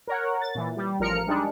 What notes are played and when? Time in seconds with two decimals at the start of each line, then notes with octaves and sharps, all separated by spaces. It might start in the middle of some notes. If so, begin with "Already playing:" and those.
0.07 A#4 C#5 F#5
0.42 A6
0.55 A#2 E3
0.77 G3
0.99 A1 F3 A#4 F6 C#7
1.27 G3 G#3 D4 D#4